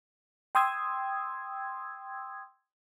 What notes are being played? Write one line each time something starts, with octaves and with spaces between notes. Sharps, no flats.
G5 C6 D#6 E6 G#6